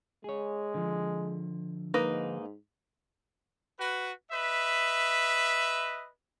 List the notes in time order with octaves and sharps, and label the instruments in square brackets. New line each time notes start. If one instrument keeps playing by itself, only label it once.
[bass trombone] G#3 [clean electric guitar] G#4 C#5
[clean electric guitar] D3 F3
[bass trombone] G#2 [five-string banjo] A#3 D#4 B4
[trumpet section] F#4 B4
B4 D#5 E5